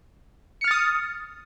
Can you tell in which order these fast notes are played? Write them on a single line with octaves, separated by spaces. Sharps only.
C#7 F6 A6 D#6